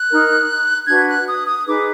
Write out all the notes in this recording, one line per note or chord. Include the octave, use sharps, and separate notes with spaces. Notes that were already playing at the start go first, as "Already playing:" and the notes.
Already playing: F#6
D#4 A#4
D4 F#4 B4 G#6
F#6
D#6
D#6
D#4 G#4 B4 D6